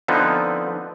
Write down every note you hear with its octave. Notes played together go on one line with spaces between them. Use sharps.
D3 F3 B3 C4 D#4